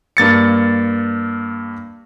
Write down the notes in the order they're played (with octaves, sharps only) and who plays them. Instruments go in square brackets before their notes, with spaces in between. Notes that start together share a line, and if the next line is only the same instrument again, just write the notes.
[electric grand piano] G2 A#3 A6 C#7